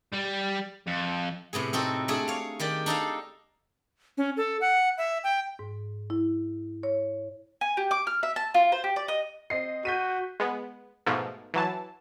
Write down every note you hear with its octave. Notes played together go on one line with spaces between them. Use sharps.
G3
F2
A2 C3 B3 G#4
C4 D#4 F#4 A4
A3 D4 G#4 D5
C#5 F5
D#3 G4 D5
D4 D#4 A4 F5
C#4
A4
F#5
E5
G5
G#2
E4
C#5
G#5
G4
D6
F6
E5
A5
F4
C5
G4
D5
D#5
C4 D#5 C7
F#4 G6 B6 D#7
G#3 B3
G#2 B2 F3 A3
E3 F#3 A5